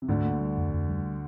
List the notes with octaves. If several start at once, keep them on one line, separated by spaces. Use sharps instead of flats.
C3
D2 G#2 D3
A#3
G3
F2
F2
G3